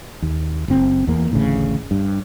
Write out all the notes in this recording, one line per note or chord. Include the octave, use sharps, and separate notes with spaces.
D#2
F#1 C4
E2 A#3
A1 D2 A2 C#3
G2